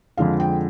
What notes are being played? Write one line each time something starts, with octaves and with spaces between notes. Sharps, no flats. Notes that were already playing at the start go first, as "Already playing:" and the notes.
F2 D3 F3 G#3 F5
G5